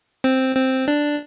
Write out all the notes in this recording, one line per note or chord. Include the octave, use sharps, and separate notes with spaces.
C4
C4
D4